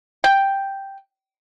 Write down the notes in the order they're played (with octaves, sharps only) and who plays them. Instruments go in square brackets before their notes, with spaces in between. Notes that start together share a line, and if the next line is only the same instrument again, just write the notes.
[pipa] G5